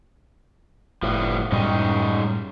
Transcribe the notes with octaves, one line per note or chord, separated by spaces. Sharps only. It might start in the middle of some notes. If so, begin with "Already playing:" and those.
F#1 A2 F3 G3 B3
F#2 A2 G3 G#3 C#4 D#4